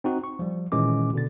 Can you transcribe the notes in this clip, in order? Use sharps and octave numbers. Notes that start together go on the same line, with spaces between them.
C4 D#4 F#4
C#6
F3 G3
A#2 D#3 E3 G#3 C#4 D6
B2 D3 A6